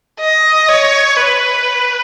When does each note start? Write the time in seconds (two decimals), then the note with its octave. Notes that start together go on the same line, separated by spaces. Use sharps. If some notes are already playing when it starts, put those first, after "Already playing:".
0.20 D#5
0.69 C#5
1.17 B4